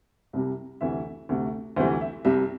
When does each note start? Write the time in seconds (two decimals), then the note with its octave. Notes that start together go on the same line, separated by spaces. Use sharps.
0.33 C2 C3 G3
0.81 D2 C3 E3 E5
1.29 D2 C3 A3
1.76 D2 C3 E3 G3 C5
2.01 E5
2.25 C2 C3 G3 E5